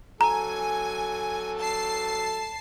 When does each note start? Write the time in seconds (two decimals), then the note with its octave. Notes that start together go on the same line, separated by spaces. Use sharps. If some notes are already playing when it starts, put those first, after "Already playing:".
0.21 F#3 A4 G#5 A#5
1.58 A5 C7